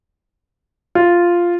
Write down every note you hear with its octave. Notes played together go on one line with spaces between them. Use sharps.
F4